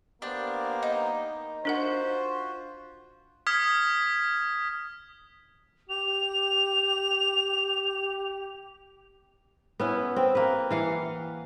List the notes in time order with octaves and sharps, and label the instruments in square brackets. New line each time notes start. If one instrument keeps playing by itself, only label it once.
[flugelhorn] A#3 [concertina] B3 G4 C5 [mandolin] D4
[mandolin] D#4
[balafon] D4 A#4 F#5 [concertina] F4 F#4 [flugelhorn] C5
[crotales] D#6 F6 G#6 B6
[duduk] G4 [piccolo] F7
[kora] B3 C#4 E4
C4
A#3 B4
E3 F5 F#5